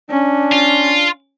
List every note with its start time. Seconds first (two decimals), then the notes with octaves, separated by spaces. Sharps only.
0.11 C#4 D4
0.53 F4